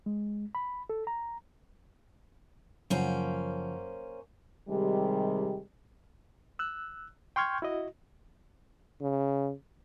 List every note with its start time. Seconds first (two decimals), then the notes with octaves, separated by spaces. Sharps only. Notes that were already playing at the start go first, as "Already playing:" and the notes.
0.06 G#3
0.55 B5
0.90 A4
1.07 A#5
2.90 F#2 C#3 F3 A#3 C#4 C5 F#5
4.69 C3 D#3 G3 G#3
6.59 E6 F#6
7.36 G5 C6 C#6 F6 G6 G#6
7.62 E4 F#4 D#5
9.01 C#3